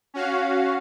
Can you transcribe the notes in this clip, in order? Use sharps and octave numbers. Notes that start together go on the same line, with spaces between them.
C#4 F#4 F5